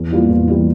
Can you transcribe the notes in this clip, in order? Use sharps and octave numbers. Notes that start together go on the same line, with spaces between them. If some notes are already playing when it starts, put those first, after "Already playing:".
Already playing: E2
E3 G3 A#3 F4
E2
E3 G3 A#3 F4